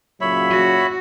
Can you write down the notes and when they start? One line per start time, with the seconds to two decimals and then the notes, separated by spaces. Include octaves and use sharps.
0.21 A#2 C#3 F#3 C#5 E5 B5
0.50 F#4